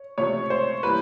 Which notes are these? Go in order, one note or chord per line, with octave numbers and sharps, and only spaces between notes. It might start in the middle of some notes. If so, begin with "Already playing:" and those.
Already playing: C#5
C#2 C3 F3 A3 C#4 C#5
C5
E3 G3 A#3 B4